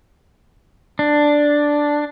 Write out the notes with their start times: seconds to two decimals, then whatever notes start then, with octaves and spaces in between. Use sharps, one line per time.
0.99 D4